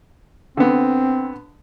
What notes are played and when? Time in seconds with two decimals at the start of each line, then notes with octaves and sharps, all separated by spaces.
0.57 D3 B3 C4